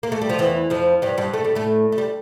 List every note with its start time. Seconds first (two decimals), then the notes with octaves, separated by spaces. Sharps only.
0.03 A#3
0.12 A3
0.22 G3
0.29 F3
0.38 E2 E3
0.70 F2 F3
1.02 G2 G3
1.18 G2 G3
1.33 A3
1.44 G3
1.55 A2 A3
1.92 A3
1.98 G3